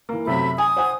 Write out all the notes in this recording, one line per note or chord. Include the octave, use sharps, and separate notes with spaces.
E3 A#3
F#2 C3 A3 E5 B5
G#5 D#6
C5 F#5 G#5